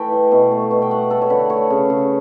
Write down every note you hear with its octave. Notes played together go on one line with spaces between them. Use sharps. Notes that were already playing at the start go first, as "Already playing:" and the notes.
Already playing: E3 A3 G5
A2
B2
A3
B2
G5
A3 F#5
A3 A4
C#5
D3 B4
A3 C#5
C#3
C#3